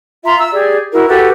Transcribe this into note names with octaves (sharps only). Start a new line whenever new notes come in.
F4 E5 A#5 C6
E6
G4 G#4 D5
E4 F#4 A#4
F#4 G4 A4 B4